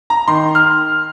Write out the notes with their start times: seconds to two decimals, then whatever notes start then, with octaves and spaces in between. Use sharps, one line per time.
0.10 A#5
0.28 D#3 C6
0.55 F6